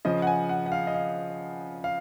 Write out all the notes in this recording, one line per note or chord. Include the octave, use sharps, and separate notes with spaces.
C#3 F3 D#5
F#5
G#5
F#5
F#5
F5
D#5
F5
F5